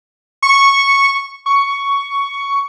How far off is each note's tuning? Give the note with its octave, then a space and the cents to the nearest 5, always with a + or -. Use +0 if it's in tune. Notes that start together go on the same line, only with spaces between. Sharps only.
C#6 -5
C#6 +10